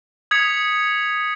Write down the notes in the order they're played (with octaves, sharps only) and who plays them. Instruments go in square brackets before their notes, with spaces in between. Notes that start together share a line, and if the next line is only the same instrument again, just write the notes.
[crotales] D#6 G#6 B6 C#7 F7